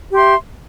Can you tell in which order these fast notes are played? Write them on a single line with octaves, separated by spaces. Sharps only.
G4 C6 E5